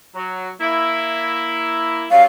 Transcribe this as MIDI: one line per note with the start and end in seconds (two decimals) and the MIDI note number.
0.15 0.51 54
0.61 2.06 58
0.61 2.06 64
2.11 2.26 43
2.11 2.26 54
2.11 2.23 77